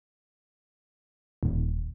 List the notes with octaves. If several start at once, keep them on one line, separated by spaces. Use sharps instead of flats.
D#1